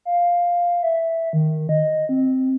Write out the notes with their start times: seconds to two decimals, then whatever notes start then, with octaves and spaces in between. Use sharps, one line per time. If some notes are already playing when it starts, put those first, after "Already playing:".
0.05 F5
0.83 E5
1.33 D#3
1.69 D#5
2.09 C4